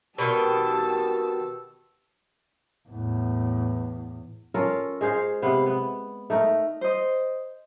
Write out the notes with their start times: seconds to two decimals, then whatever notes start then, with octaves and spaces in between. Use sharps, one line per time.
0.18 B2 D#3 G4 A5 E6
2.89 E2 A2
4.54 C#4 F4 A4 A#4
5.01 G#3 G#4 C5 F5
5.42 C3 B3 F5
5.66 B3
6.30 A3 D#4 A#4
6.81 C5 D#5